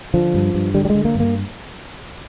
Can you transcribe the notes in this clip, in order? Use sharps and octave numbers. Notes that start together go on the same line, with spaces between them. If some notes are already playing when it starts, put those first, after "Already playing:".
D3 F3
G2
G2
D3 G3
G3
G#3
D3
A#3
G2
A#3